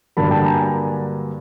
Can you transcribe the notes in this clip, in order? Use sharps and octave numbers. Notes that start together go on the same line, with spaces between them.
G2 D3 F#3 A#3 D4 A5 B5
G5 A5
G#5 A#5